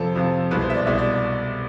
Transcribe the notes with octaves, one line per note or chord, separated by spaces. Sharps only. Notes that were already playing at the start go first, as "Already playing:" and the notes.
Already playing: F2 C3 F3 A4
F2 C3 F3
C2 B2 G#3 B4
C5
E5
D5
C2 B2 G#3 E5
D5